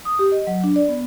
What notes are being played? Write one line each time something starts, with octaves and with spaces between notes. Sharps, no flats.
D#6
G4
D#5
F#3
D4
D5
B3